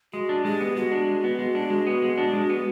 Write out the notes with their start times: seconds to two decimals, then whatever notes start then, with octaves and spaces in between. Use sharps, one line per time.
0.13 G#3 F#4
0.29 D4
0.45 G#3 G4
0.61 B3
0.76 G#3 F#4
0.92 D4
1.08 G#3
1.24 B3
1.39 G#3
1.55 D4
1.70 G#3
1.87 B3
2.02 G#3
2.18 D4
2.33 G#3
2.50 B3